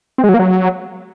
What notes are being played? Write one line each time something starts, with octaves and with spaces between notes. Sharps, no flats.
C4
G#3
F#3
A#3
F#3